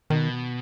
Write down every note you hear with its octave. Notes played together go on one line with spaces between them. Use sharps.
B2 D#3